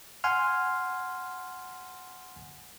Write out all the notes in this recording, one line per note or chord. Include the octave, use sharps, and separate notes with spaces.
F#5 G#5 C6 F6